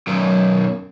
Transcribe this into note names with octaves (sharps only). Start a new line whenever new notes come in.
B1 F#2